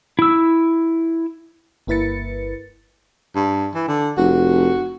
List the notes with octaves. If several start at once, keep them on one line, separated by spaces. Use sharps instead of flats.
E4 E6
G1 A#3 E4 B4 A6 C#7
G2
E3
D3
F1 F#4